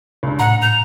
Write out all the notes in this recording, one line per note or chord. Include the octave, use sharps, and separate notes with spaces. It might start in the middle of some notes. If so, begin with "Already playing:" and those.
C#2 G2
A2 F#5 A#5
G6 F7